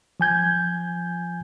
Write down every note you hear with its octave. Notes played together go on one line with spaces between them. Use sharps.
F3 G#5 G6 G#6